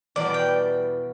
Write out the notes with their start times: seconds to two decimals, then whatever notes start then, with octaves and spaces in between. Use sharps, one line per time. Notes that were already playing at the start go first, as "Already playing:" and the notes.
0.16 E2 B2 G3 D5
0.34 G5